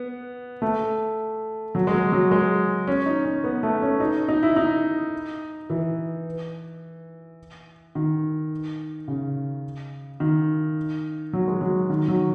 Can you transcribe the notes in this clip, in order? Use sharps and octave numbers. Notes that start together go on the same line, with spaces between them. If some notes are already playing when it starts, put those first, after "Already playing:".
Already playing: B3
A3
F#3
G#3
F#3
F#3
G#3
C#4
D#4
C#4
B3
A3
C#4
D#4
D#4
E4
D#4
E3
D#3
C#3
D#3
F#3
G#3
F#3
D#3
F#3